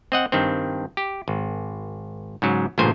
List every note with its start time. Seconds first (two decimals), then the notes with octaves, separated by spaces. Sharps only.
0.12 C4 D#5 F#5
0.32 G2 D#3 C4
0.97 G4
1.28 G#1
2.42 G#2 C#3 F#3
2.78 A1 G2 A#2 C#3 C5 G#5